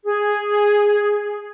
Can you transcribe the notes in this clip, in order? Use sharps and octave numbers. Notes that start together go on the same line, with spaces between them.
G#4